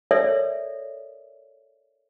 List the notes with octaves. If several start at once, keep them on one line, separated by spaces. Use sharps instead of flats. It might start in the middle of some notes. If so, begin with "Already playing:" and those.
A4 A#4 C#5 D5 E5